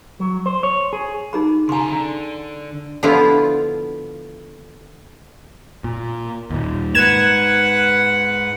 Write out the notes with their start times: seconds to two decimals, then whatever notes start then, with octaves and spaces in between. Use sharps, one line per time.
0.20 F#3
0.46 C5
0.63 C#5
0.93 G#4
1.33 D#4 G#4 B5
1.69 C#3 G#5 A#5 C6
1.91 D3
3.03 D3 F3 B3 E4 F4
5.84 A#2
6.50 D#2 A#2
6.95 G#2 B4 F#5 G#6 E7